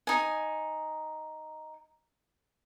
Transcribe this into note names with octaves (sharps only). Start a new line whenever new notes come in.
D#4 G#5